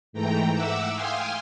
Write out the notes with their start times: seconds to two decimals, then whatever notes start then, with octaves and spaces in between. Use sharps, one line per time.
0.13 G#2 E3 A3 G5 A#5
0.51 E5 F#5 D6 E6
0.92 F5 G5 G#5 C6 D#6 F6